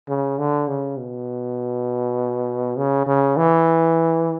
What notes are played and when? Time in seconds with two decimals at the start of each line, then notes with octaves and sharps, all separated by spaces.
0.09 C#3
0.39 D3
0.68 C#3
0.98 B2
2.77 C#3
3.07 C#3
3.37 E3